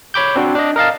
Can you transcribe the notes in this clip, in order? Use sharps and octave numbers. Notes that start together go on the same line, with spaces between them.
C#5 B5 D6 G6
C4 D4 F#4 C5
D4 D#5
A#4 D#5 F5 A5